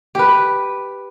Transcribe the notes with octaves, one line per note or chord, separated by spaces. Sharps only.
G4 B4